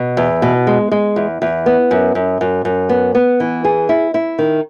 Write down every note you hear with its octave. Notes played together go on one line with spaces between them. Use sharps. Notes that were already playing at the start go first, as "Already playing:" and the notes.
Already playing: B2
E2
B2
G#3
G#3
E2
E2
B3
F#2
F#2
F#2
F#2
B3
B3
E3
G#4
E4
E4
D#3